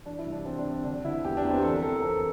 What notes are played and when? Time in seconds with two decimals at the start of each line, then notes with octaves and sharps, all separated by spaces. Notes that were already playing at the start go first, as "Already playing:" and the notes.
0.06 E3 D4
0.19 E4
0.26 C2
0.32 D4
0.46 E3 C4
0.58 D4
0.64 C2
0.84 D3 D4
1.04 D3 E4
1.25 E2 G4
1.37 D4
1.44 E2
1.50 C4
1.58 G4
1.63 E3 A4
1.74 A#4
1.82 E3 A4
1.92 A#4
2.02 F2 A4